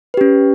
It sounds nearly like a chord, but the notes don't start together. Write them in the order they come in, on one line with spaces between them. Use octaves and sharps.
B4 G4 C#4